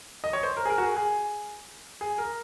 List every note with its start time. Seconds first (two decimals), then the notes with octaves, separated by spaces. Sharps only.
0.24 D#5
0.33 C#5
0.43 C5
0.57 A#4
0.65 G#4
0.70 A#4
0.78 F#4
0.83 G#4
0.96 G#4
2.01 G#4
2.18 A#4